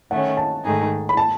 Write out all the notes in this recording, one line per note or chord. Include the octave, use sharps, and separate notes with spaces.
D#3 A3 C#4 F#5
A5
G#2 D#3 A3 D#4 G#4
B5
A5